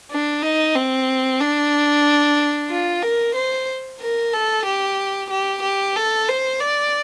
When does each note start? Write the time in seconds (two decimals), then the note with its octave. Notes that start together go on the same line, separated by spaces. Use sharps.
0.11 D4
0.43 D#4
0.76 C4
1.41 D4
2.70 F4
3.03 A#4
3.35 C5
4.00 A#4
4.33 A4
4.66 G4
5.30 G4
5.63 G4
5.96 A4
6.29 C5
6.60 D5